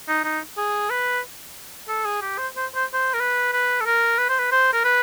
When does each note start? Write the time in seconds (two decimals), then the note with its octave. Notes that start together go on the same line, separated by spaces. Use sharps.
0.08 D#4
0.25 D#4
0.57 G#4
0.90 B4
1.88 A4
2.06 G#4
2.22 G4
2.38 C5
2.57 C5
2.75 C5
2.94 C5
3.14 A#4
3.20 B4
3.53 B4
3.81 A4
3.86 A#4
4.18 B4
4.29 C5
4.39 B4
4.52 C5
4.74 A#4
4.84 B4